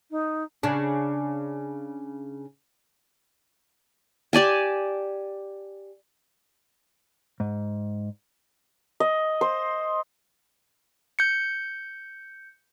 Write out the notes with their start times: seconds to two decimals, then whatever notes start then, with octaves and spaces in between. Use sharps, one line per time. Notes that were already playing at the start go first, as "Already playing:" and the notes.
0.10 D#4
0.63 C#3 D4
4.33 G4 D5 G#5 A5
7.40 G#2
9.00 D#5
9.41 C5
11.19 G6 C#7